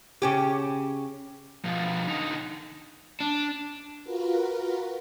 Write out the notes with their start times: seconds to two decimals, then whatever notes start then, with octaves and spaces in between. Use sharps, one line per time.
0.22 C#3 C#4 G4
1.65 B2 F3
2.08 D3 D#4
3.20 D4
4.04 F4 F#4 A#4 B4